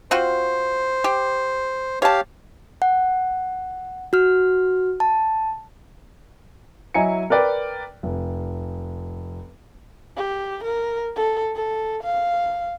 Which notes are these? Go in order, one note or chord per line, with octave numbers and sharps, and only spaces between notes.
C4 F4 F#4 C5
G4
G4 C#5 F5 A5
F#5
F#4 F6
A5
F#3 E4 D#5 G#5 A#5 C#7
A#4 B4 D5 G5
F1
G4
A#4
A4
A4
F5